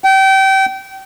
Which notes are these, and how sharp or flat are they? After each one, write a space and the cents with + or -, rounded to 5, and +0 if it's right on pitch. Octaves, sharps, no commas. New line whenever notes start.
G5 -30